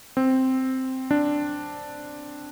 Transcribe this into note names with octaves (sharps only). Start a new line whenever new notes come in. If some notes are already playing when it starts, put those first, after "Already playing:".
C4
D4